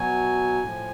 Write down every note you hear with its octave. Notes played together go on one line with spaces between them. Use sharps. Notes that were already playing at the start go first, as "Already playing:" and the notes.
Already playing: B2 F#3 G#5
A2 F3